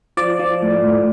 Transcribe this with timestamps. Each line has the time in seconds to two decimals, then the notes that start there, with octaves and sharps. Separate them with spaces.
0.17 F3 D5
0.39 F3
0.62 A2
0.84 A2